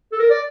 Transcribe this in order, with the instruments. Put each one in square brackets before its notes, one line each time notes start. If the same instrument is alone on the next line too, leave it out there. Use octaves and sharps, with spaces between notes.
[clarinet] A4
A#4
D5